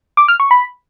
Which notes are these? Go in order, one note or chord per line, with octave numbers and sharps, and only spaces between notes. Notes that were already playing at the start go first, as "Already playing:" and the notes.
D6
F6
C#6
B5